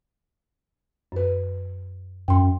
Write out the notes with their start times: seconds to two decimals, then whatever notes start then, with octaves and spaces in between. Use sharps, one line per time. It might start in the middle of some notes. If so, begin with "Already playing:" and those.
1.12 F#2 B4
2.28 F#2 G5 C6